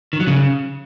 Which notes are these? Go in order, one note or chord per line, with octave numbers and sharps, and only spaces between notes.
D#3
F#3
C#3